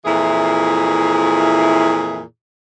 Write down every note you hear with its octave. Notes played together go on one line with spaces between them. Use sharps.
F2 A#2 E3 E4 G#4